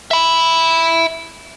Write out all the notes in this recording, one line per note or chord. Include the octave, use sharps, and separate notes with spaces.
E5 B5